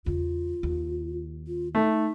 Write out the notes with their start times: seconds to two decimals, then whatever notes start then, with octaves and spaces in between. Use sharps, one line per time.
0.06 E2 C#3 F4
0.63 D#2
1.47 F4
1.75 A3 D#4